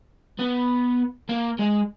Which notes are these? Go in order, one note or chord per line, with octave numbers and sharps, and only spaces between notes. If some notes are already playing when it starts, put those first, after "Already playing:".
B3
A#3
G#3